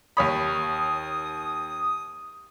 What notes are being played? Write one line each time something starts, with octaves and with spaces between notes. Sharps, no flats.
D#2 C#5 B5 D#6